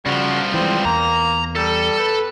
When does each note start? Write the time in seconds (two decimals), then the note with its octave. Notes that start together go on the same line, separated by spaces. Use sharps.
0.06 G2 C#3 F3 F#4
0.54 E3 G#3 C4
0.85 E2 A#3 A#5
1.56 G3 A4
1.99 B4